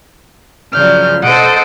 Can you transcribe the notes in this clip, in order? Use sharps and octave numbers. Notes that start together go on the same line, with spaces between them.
G2 C#3 F3 F#3 D5 F6 G6
B2 A4 C5 D#5 F#5 D7